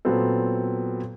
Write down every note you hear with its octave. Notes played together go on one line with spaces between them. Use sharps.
A#2 F#3 B3 C4 A4